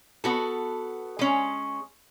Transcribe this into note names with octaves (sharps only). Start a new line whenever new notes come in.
B3 F#4 A4
G#3 C#4